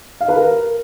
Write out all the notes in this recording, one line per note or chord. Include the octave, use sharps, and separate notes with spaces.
F5
B4
A#4